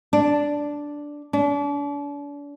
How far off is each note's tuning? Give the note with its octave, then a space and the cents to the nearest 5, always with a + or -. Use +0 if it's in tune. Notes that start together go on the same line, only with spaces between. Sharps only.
D4 -5
D4 -40